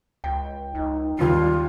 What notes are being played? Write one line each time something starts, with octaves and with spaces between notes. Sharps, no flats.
C#2 G5
C#2 D#4
G#1 D#2 G3 F4